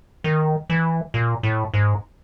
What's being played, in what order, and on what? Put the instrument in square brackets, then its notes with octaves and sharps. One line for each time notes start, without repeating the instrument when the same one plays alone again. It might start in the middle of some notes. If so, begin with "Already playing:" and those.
[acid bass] D#3
E3
A#2
A2
G#2